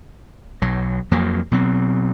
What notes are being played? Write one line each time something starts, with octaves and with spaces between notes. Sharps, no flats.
B1 F#3
F2 F3 F#3 A#3
B2 F#3 C4